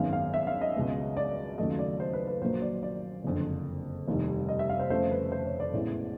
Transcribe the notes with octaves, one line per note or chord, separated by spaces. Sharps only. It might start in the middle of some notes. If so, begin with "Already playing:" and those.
Already playing: G#1 F#2 D#3 G#3 B3 F5
F5
E5
F5
D#5
C#2 B2 G#3 B3
D5
D#2 C#3 F#3 A3 D#5
D5
C5
B4
B4
A#1 A#2 F#3 A#3 C5
D5
D5
F#1 F2 D3
F1 D#2 D#3 G3
D#5
E5
F5
C5
F1 F2 C#3 F3 A3 C5
B4
C5
C#5
D5
A1 A2 E3 G#3 B3